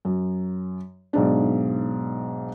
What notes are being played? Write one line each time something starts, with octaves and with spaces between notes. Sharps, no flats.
F#2
B1 G#2 D4